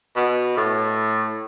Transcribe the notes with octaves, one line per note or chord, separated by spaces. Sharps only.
B2
A2